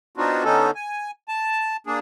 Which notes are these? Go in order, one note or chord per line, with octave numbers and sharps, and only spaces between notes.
B3 C4 D4 D#4 F4 F#4
D3 B3 C#4 D#4 A4
G#5
A5
A#3 D4 G#4